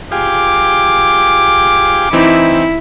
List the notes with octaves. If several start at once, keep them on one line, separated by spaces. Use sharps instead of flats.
F4 G4 G#4 D6
E3 C4 D#4 E4